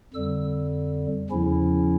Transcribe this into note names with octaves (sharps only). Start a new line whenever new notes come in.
F2 D3 G3 E6
E2 C#3 F3 C#4 E4